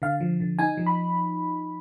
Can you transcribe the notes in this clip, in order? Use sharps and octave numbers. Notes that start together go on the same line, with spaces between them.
D3 F5
F3
D3
D#4 G#5
F3
B5